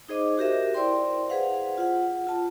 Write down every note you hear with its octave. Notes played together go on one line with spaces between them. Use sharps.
D#4 G#4 C5 D#5 D6
F#4 G4 A#4 E5
E4 C5 D5 G5 C6
G#4 B4 C5 F5 F#5
F4 F#5
F4 A5